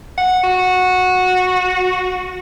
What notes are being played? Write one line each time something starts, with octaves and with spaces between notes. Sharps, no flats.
F#5
F#4